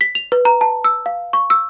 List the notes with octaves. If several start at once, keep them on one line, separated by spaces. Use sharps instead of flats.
B6
F7
B4
A#5
A5
E6
F5
C#6
E6